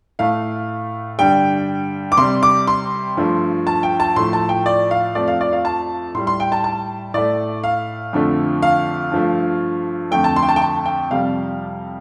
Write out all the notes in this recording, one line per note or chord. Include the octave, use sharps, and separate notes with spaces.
A2 A3 F5
G2 D3 G3 G5
D6
C3 G3 C6
D6
C6
G2 F3 A3
A5
G5
A5
A2 F3 A3 C6
A5
G5
D5
F5
F2 F3 A3 D5
F5
D5
F5
A5
A2 G3 C6
C6
G5
A5
A5
A2 A3 D5
F5
F2 D3 F3 A3
F5
G2 F3 A3
F2 D3 A3 G5
A5
C6
G5
A5
G5
A5
G5
F2 C3 G3 F5